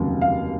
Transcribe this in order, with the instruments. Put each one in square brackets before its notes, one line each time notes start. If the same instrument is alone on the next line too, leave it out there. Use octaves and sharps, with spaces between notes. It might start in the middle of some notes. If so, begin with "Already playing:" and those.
Already playing: [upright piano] F1 D#2 C#3 F#3
F5